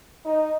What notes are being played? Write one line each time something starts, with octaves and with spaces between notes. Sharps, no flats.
D#4